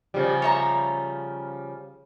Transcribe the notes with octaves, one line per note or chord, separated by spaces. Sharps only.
C#3 F3 G3
C#5 E5 A#5